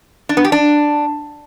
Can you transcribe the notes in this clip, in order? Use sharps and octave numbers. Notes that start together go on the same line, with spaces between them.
D4
B3
G4
D4